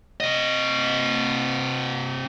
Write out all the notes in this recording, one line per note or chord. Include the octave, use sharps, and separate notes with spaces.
C3 D#5